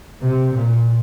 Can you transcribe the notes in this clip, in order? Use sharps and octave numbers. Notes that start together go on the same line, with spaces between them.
C3
A#2